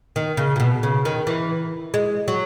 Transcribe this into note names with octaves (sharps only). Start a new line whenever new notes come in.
D#3
C#3
A#2
B2
C#3
D#3
E3
G#3
F#3